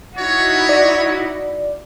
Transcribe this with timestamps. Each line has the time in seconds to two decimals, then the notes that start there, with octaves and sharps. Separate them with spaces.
0.17 D#4 E4 F#4 C#5
0.69 D5